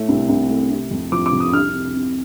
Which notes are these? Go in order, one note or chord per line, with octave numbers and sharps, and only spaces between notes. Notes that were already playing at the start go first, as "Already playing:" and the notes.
Already playing: A2 A3
C2
C2
A3
C3
F2
F3 D6
D6
F2
D#6
C2 F6
C3
C3